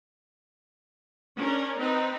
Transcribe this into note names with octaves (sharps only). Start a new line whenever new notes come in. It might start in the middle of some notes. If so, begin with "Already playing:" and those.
C#4 D4 A#4
C4 D#4 B4